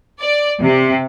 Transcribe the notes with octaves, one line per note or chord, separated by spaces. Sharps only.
D5
C3